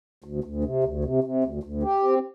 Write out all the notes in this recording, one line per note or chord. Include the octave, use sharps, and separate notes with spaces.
D2
D2
C3
D2
C3
C3
D2
D2
G4
C4